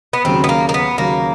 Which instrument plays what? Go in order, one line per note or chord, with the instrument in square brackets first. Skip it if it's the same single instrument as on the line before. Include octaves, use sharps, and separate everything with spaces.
[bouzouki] B3
[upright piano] D#2 C#3 F#3 [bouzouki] C4
[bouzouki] B3
A#3
A#3
B3
[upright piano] D#2 C#3 F#3 [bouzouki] A#3